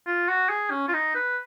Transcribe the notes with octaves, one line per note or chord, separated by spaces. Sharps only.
F4
F#4
G#4
C#4
F4
D#4
B4